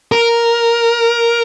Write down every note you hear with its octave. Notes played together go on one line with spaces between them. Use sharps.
A#4